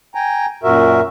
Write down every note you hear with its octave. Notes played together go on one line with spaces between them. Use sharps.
G5 G#5 A#5
F#2 A#2 F#4 A#4 E5